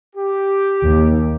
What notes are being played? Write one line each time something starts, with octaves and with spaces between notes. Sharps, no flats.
G4
D#2